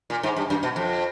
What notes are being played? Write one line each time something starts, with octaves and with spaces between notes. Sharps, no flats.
A#2
G#2
G2
F#2
B2
F2